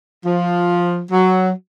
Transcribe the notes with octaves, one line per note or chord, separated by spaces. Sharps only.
F3
F#3